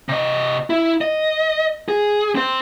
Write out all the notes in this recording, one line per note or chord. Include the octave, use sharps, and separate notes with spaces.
C3 D#5
E4
D#5
G#4
C4 C5